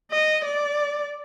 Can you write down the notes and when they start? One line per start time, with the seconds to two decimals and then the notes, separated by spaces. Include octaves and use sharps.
0.12 D#5
0.44 D5